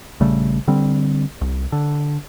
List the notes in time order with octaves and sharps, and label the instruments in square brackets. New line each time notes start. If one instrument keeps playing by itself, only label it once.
[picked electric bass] A#1 C#3 G3 A3
D3 G3 C4
C2
D3